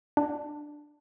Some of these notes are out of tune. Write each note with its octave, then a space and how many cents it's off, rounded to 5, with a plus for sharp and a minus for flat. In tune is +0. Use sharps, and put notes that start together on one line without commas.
D4 +10